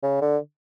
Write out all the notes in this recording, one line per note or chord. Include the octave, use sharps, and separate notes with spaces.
C#3
D3